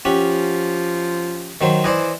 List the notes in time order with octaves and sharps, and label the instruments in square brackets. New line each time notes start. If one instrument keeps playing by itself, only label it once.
[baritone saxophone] F3 [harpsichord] C#4 G4 F#5
[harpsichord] D#3 F#3 C5
[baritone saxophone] E3 [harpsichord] C5 D5 D#5